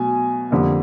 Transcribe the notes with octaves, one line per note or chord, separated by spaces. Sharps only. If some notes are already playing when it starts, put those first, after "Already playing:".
Already playing: B2 F#3 A3 G#5
F2 D3 G3 A#3